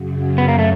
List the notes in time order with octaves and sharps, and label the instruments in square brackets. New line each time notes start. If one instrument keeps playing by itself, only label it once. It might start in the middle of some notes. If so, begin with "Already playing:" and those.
Already playing: [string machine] F#2 C#3 F#3
[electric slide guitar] B3
A#3
A3